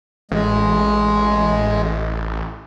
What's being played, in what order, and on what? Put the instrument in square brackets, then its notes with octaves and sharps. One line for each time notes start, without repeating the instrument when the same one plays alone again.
[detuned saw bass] A1 [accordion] G#3